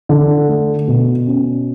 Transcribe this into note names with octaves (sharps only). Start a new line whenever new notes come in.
D3
A3
B2
C#4